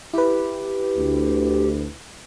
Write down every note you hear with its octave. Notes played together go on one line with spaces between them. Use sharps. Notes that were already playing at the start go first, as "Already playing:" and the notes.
E4 G4 B4
D2